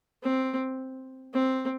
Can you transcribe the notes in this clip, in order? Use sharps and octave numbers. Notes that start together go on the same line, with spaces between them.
C4
C4